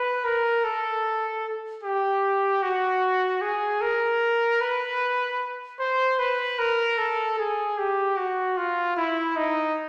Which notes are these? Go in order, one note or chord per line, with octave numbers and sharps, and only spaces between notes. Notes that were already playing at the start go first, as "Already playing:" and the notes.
Already playing: B4
A#4
A4
G4
F#4
G#4
A#4
B4
C5
B4
A#4
A4
G#4
G4
F#4
F4
E4
D#4